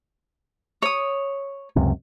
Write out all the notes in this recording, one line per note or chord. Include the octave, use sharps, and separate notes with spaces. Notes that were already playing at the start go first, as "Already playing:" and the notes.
C#5 D#6
C#2 F#2 C3